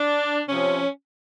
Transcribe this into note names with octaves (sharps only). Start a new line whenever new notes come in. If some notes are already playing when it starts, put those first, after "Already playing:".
Already playing: D4
C3 F3 C#4